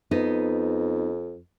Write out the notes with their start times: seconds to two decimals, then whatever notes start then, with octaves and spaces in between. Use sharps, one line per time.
0.11 F2 B3 D#4